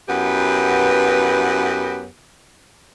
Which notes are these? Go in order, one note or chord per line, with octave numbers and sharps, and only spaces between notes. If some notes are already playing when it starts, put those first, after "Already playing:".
F#2 B3 E4 G4 B4